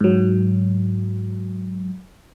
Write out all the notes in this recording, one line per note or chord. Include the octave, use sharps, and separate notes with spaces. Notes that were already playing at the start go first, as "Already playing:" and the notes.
G#2 F#3